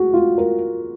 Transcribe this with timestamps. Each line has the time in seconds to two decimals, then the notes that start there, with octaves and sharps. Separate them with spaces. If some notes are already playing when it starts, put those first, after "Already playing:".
Already playing: F#4 G#4
0.14 F4
0.38 A#4